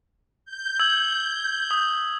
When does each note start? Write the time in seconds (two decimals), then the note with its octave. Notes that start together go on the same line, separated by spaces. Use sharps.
0.45 G6
0.80 E6 G#6 F#7
1.71 D#6